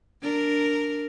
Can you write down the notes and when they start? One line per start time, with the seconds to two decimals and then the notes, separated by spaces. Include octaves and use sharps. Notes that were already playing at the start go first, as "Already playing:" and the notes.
0.22 D4 A#4